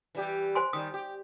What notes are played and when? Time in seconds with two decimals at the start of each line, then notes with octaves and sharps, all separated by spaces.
0.15 E3 G3 G4
0.55 C5 G#5 C6
0.73 D#3 G3 D#6
0.94 G4